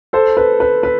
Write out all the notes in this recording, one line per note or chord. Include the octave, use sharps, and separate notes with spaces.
A4 C5
B4
B4
B4